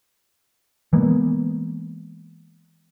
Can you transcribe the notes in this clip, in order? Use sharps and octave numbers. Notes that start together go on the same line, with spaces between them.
E3 G#3 A#3 B3